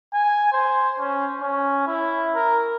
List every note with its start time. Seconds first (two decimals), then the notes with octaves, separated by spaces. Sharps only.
0.14 G#5
0.53 C5
0.99 C#4
1.41 C#4
1.87 E4
2.35 A#4